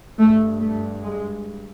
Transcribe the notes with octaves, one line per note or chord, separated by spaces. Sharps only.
G2 A3
A3
G#3